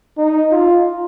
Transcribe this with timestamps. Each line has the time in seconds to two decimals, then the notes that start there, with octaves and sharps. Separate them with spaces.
0.17 D#4
0.52 F4